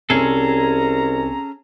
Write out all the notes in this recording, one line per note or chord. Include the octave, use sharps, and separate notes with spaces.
C2 C3 C4 C#4 G#4 A4 A#5